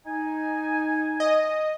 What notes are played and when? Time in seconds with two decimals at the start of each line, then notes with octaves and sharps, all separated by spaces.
0.05 D#4 G#5
1.20 D#5